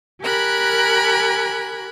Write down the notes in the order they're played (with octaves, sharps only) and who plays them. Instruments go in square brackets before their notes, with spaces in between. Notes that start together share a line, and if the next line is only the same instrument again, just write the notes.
[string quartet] G4 A#4 G#5 B5 F#6